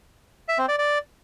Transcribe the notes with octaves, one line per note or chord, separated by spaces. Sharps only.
E5
C4
D5
D5